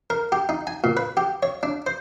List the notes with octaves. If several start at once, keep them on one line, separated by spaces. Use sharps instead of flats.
A#4
G4
D#4
G#5
A#2
B4
G4
C#5
D4
C5